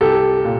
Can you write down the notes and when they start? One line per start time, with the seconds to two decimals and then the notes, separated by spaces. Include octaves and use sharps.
0.01 C2 G4 A4
0.45 A#2